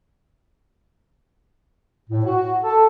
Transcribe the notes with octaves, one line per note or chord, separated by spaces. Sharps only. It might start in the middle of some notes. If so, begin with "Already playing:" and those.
A2
F#4
A4